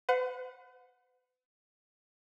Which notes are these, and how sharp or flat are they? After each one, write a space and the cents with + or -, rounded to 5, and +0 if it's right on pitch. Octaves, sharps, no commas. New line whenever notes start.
B4 +45 F#5 -25